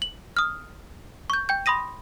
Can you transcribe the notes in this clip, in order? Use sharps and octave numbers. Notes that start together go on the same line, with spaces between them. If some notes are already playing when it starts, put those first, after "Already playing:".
F#7
D#6 F6
C#6 G6
G5 G6
B5 C6 D#6 A#6 D#7